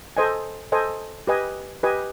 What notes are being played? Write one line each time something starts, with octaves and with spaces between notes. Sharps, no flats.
A4 C5 D#5 G#5
A4 C5 D#5 G#5
G4 B4 D#5 G#5
G4 B4 D#5 G#5